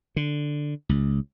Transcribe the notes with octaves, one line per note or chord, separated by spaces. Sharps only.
D3
C#2